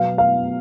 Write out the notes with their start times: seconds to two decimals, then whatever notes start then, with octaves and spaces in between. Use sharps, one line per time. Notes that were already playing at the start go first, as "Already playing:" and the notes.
Already playing: B2 F#3 B3 F5
0.18 F5